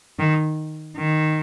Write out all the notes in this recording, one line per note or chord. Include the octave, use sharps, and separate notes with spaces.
D#3
D#3